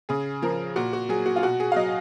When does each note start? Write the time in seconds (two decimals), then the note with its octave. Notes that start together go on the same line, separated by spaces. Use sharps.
0.09 C#3 G#4
0.42 F3 A#4
0.76 A#2 F#4
0.93 F#4
1.09 F#3 G#4
1.26 F#4
1.36 F4
1.43 B2 F#4
1.60 G#4
1.72 F5
1.76 F#3 D#5